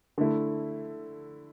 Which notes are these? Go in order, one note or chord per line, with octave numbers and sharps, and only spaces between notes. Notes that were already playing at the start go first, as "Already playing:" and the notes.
D3 A3 E4